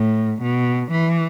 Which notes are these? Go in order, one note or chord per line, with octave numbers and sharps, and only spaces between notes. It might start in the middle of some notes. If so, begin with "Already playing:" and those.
Already playing: A2
B2
E3